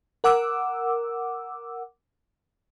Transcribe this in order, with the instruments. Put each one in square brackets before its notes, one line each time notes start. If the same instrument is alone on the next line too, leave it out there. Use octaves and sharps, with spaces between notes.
[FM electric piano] A#4 F#5 D6 E6